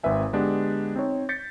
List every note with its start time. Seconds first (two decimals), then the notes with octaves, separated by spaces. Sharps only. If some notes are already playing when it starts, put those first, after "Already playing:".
0.03 G#1 C4 B4 E5 G#5
0.33 D3 G#3 B3 D4 G4
0.96 C4 D#4 C#5
1.29 G6 A6 B6 C#7